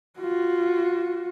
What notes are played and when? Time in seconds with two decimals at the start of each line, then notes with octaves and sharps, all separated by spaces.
0.20 F4 F#4